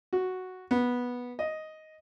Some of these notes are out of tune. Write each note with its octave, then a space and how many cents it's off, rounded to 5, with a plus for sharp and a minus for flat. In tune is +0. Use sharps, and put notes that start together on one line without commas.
F#4 +0
B3 -10
D#5 +5